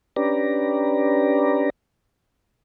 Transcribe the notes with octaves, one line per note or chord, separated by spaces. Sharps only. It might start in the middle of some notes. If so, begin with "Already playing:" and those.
C#4 D4 G4 B4 D5 A#5